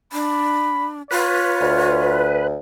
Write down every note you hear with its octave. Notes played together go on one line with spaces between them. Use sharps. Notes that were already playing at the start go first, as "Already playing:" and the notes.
D4 B5
F4 B4 C#5
D2